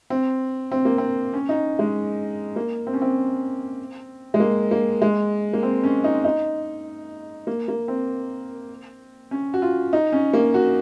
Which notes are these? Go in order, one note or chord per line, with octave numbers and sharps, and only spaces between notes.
C4
C4
A#3
C4
C#4
D#4
G#3
A#3
C4
C#4
C4
G#3
A#3
A#3
G#3
A#3
C4
C#4
D#4
D#4
A#3
A#3
C4
C#4
F#4
F4
D#4
C#4
A#3
F#4